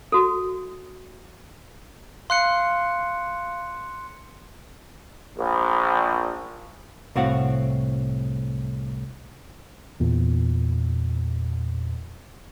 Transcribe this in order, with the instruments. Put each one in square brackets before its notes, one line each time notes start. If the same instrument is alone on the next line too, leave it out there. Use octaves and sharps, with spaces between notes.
[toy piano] F#4 A4
[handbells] F5 [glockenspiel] C6 F#6 C#7
[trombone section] A#1
[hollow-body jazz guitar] C2 A2 C4 F#4 F5 F#5
[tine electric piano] E2 A#2